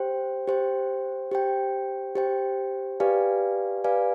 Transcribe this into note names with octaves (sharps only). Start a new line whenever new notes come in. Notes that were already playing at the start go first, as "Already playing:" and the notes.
Already playing: G4 C5 G5
G4 C5 G5
G4 C5 G5
G4 C5 G5
G4 B4 D5 F5 G#5
G4 B4 D5 F5 G#5